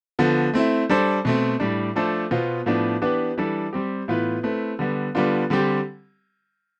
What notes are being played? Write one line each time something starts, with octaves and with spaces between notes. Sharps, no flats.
D3 F3 B3
A3 C4 E4
G3 D4 A4 C5
B2 A3 C4
A2 G3 D4
F3 A3 D4 A4 C5
B2 B3 F4 C5
A2 F3 B3 D4
E3 B3 D4 G4 B4
E3 G3 D4 A4
G3 C4 G4
A2 E3 B3 F4 B4
A3 C4 E4 B4
D3 G3 B3
D3 G3 B3 D4 F4
D3 G3 C4 G4